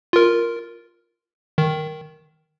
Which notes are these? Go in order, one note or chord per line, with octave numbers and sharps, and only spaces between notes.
F4 A#4
D#3